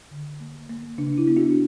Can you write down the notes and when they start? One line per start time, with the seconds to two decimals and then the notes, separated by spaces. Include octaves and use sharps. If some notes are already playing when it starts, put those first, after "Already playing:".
0.11 D3
0.40 A#3
0.69 A#3
0.98 C#3 D4
1.18 E4
1.28 B3
1.37 D4 F#4